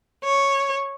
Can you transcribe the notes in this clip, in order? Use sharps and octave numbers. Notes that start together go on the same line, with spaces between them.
C#5